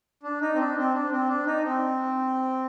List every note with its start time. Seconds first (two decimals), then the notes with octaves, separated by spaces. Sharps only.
0.23 D4
0.41 D#4
0.54 C4
0.59 D4
0.77 C4
0.94 D4
1.12 C4
1.29 D4
1.46 D#4
1.65 C4